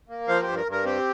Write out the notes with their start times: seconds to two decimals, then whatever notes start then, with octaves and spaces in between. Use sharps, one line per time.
0.09 A#3
0.28 F3 C5 F5
0.42 G4 C5
0.48 G2
0.57 A#4
0.66 G2
0.72 A#4
0.85 C4 G4